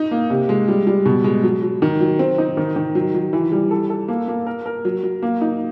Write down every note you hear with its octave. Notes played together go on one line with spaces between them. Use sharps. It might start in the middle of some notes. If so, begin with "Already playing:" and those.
Already playing: D#4
A#3
C3
G#3
G3
G3
B2
G#3
F#3
F#3
D#3
F#3
C4
D#4
D#3
D#3
F#3
F#3
E3
G3
A4
A4
A#3
A#3
A#4
A#4
F#3
F#3
A#3
D#4